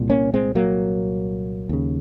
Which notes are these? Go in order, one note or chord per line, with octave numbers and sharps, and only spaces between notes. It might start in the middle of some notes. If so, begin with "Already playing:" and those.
Already playing: C2 A#2
A#3 C#4
G#3 C4
F#3 A#3
D#2 C#3